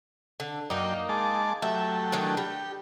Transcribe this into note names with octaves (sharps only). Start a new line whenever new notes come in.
D3
F#2 A#3 D#4 D5 G5
G#3 A5 D6
F#3 A3 G4 E5
D#3 E3 D4
G3 G4